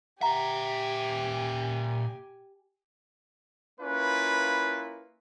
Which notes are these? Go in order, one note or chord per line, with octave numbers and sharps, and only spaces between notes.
A#2 G4 E5 F#5 G#5 A#5
A#3 C#4 E4 F4 B4